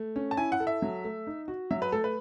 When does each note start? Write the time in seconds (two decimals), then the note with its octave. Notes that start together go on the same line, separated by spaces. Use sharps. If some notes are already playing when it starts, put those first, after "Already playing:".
Already playing: A3
0.16 C#4
0.31 A5
0.37 E4 G#5
0.52 F#5
0.60 A4
0.67 E5
0.82 F#3
1.04 A3
1.27 D#4
1.48 F#4
1.71 F#3 E5
1.82 B4
1.92 A3 A4
2.04 B4